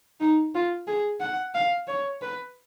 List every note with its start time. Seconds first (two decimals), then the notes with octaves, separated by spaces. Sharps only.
0.20 D#4
0.55 F4
0.87 G#4
1.21 F#5
1.55 F5
1.88 C#5
2.22 B4